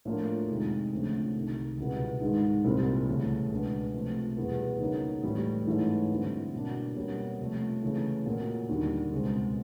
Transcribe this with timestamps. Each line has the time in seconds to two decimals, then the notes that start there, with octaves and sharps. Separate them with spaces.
0.05 A2 F3 A#3 D4 F4
0.48 F2 C3 D#3 G#3
0.92 D2 C#3 F3 A3 C4
1.34 C2 C3 D#3
1.78 C#2 B2 G3 B3 E4
2.21 G#2 D#3 G#3
2.64 C2 A#2 G3 C4 E4
3.07 C#2 C#3 E3 A3
3.51 C#2 B2 G#3 B3 D4
3.94 C3 F3 A3 C4
4.37 E2 B2 G3 B3 E4
4.80 C#3 F#3 A#3 D#4 F#4
5.23 A2 E3 G3
5.67 G#2 E3 A3 C#4 E4
6.10 D3 G3 C4 E4
6.54 B2 F#3 A#3 D4
6.96 B2 G3 A#3 C#4 F#4
7.39 C3 F3 A3 C#4
7.82 C#3 E3 A3
8.26 A#2 F#3 A#3
8.69 D#2 D3 G3
9.12 C#2 B2 G#3 C4